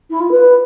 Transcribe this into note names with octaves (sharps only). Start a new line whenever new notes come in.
E4
F4
B4